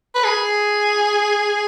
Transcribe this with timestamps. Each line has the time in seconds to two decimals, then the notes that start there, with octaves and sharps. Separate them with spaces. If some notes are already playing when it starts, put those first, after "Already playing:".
0.15 B4
0.24 G#4